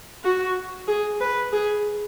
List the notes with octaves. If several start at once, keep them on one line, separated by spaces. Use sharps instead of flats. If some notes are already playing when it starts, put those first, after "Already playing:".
F#4
G#4
B4
G#4